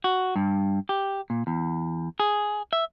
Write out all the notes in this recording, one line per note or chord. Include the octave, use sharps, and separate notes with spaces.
F#4
G2
G4
A#2
E2
G#4
E5